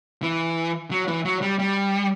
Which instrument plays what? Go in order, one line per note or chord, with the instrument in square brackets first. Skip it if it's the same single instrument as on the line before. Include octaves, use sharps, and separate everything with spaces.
[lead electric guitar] E3
F#3
E3
F#3
G3
G3